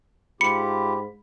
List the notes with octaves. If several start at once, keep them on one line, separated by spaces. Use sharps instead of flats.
G#2 F4 G4 B5 C#7